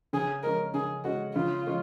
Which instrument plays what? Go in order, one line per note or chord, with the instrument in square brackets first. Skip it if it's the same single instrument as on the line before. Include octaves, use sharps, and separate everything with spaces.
[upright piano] C#3 [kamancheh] G#4
[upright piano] G#3 C#4 [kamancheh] A#4
[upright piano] C#3 [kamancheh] G#4
[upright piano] G#3 C#4 [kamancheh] F#4
[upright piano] C#3 [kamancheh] F4
[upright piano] G#3 C#4